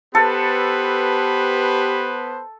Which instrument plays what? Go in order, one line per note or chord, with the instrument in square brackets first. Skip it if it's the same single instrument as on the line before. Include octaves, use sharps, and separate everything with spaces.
[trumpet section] B3 B4 C5 [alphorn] G4 [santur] A4